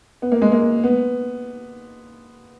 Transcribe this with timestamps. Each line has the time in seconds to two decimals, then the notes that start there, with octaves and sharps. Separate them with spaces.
0.22 B3
0.32 A#3
0.42 G#3
0.52 A#3
0.84 B3